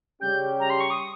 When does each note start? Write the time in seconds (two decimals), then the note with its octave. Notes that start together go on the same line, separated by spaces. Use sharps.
0.21 C#3 G3 C#4 G4 G6
0.60 A#5
0.70 C6
0.80 C#6
0.90 D#6